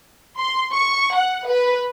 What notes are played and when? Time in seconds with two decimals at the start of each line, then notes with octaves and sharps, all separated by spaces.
0.37 C6
0.73 C#6
1.15 F#5
1.48 B4